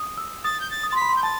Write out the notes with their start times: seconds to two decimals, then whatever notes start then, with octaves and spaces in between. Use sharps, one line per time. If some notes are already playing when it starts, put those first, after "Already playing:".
Already playing: D#6
0.17 E6
0.44 D#6 A6
0.60 G6
0.71 A6
0.83 D#6
0.90 C6 A6
0.97 B5 B6
1.09 C6
1.16 G6
1.23 A5 A6